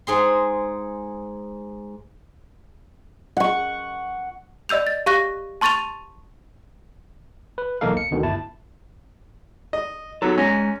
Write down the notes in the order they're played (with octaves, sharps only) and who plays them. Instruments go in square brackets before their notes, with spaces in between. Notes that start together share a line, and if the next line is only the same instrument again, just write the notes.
[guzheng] G#2 G#4 C6
[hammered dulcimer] F#5 C#6
[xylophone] D5 D#5 E6 G6 F7
A6
G4 F5 C#6 F#6 A#6
A5 C6 C#6 A6 D#7 F7
[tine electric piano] B4
B1 E2 A#3 D#4 A4 F5
C#7
D2 B2 D3 D#3
G1 E4 A5
[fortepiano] D#5
[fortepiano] F#3 [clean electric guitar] B3 D#4 A4
[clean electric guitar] G#3 A#5 [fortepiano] C#4